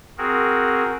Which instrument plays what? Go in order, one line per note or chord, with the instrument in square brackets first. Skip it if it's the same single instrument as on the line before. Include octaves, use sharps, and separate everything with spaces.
[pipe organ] C4 F#4 G#4 A#4